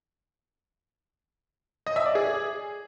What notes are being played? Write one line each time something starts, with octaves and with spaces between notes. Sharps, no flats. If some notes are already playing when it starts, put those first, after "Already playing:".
D#5
E5
D5
G#4